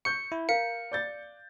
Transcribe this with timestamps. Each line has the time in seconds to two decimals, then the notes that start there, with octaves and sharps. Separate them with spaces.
0.05 C#6 G6 C#7
0.32 E4
0.49 A#4 F5 C#7
0.92 D5 G6 A6